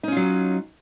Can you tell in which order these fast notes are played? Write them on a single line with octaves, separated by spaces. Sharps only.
D#4 C#4 F4 F#3